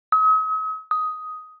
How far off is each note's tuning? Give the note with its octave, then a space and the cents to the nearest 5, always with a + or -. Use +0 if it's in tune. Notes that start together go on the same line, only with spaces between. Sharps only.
D#6 +45
D#6 +10